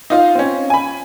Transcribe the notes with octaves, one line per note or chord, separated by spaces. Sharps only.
D#4 F4 F5
C4 C#4
G#5 B5